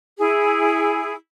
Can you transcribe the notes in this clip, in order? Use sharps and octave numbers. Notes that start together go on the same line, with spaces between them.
E4 G#4